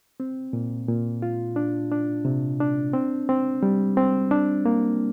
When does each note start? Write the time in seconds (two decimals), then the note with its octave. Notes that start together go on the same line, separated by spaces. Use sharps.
0.20 C4
0.53 A#2
0.89 A#2
1.22 F4
1.56 D4
1.91 D4
2.25 C3
2.60 D4
2.93 C4
3.29 C4
3.63 G3
3.97 C4
4.31 D4
4.66 A#3